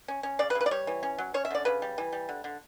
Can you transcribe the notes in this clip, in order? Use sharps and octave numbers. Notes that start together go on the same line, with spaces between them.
C#4
C#4
C#3 D5
B4
C#3
B4
D5
G3 C#5
E3
C#4
F#3
C#4 C#5
E5
D3 D5
C#3 B4
G3
E3
G3
D3
D3